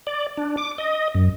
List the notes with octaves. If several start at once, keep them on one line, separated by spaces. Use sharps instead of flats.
D5
D4
D6
D#5
F#2